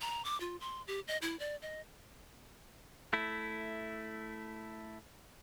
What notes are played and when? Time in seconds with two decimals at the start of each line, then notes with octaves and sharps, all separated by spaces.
0.01 A#5
0.25 D6
0.40 F4
0.60 C6
0.87 G4
1.08 D#5
1.22 E4
1.39 D5
1.62 D#5
3.13 A3 E4